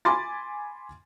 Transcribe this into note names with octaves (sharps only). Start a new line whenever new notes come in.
G#5 B5 C6 D6 A6